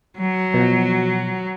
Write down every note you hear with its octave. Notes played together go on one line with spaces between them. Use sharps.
F#3
B2 F3